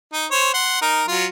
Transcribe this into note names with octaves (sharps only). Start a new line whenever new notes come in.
D#4
C5 C#5
F#5 C6
D#4 A#4
F#3 F4